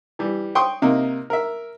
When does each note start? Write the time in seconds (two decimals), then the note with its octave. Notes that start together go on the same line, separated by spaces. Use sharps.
0.19 E3 G3
0.55 G5 C6 C#6 D#6
0.82 C3 A#3 D#4
1.30 A#4 E5